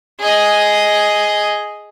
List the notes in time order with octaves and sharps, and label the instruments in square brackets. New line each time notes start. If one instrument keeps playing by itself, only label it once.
[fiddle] G#4 D#5